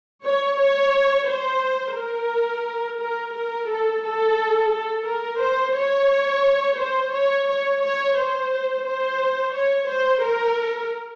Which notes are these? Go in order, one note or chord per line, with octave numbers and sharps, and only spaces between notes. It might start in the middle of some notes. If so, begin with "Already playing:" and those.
C#5
C#5
C5
A#4
A#4
A#4
A4
A4
A4
A#4
C5
C#5
C5
C#5
C#5
C#5
C5
C5
C#5
C5
A#4